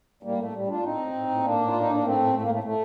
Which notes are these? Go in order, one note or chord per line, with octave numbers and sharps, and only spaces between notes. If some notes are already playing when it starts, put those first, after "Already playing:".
A2 G3 A#3
A2 A3
A2 G3
A2 D4 F4
A2 C4 D#4
A2
A2
A2
A2 A#3 D4
A2
F4
A2
D#4
A2 D4
A2 A3 C4
A2
A2 A3
A#3
A2 A3
A2 A3